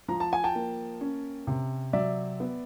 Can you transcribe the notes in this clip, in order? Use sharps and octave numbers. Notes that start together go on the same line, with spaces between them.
F3 A#5
A5
G#5
G5 A5
A#3
C#4
C3
F#3 D5 E5
B3